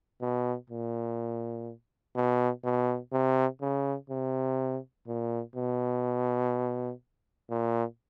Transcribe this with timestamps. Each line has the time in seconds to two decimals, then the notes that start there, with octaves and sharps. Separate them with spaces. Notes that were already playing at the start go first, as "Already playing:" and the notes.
0.21 B2
0.70 A#2
2.16 B2
2.64 B2
3.12 C3
3.61 C#3
4.10 C3
5.07 A#2
5.56 B2
7.50 A#2